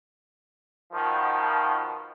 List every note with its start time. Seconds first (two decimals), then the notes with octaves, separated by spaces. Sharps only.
0.92 B2 D#3 F3